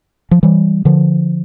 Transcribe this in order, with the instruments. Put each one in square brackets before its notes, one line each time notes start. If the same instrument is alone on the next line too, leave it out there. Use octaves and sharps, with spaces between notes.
[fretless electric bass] F3
E3 G3
D3 F3